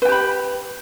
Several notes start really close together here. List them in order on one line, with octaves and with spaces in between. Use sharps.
B4 G5 G4 B5